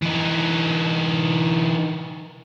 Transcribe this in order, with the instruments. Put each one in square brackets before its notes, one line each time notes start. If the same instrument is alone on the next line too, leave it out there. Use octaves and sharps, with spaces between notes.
[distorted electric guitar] E3 D#4